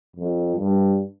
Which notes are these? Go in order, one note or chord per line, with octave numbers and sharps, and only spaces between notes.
F2
G2